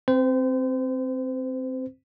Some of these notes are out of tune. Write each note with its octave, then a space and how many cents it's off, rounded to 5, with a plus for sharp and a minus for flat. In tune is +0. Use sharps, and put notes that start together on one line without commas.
C4 +0 C5 -35